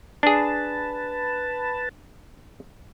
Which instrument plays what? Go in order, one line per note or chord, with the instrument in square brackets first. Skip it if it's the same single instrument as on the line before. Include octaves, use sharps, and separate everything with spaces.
[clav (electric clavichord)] D4 G#4 [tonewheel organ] B4 A5